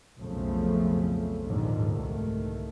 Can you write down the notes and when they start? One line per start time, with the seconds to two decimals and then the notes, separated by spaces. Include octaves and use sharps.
0.19 B1 F2 C#3 F3 A3
1.45 A#1 D#2 G#2 D3 D#3 F3
1.89 C2 D#3 A3